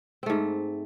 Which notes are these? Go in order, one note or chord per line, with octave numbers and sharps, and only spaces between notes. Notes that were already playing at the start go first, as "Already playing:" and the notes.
G#2 A3 C4